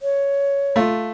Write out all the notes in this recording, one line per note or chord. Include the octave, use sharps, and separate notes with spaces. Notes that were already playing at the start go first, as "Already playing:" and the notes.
C#5
A3 F4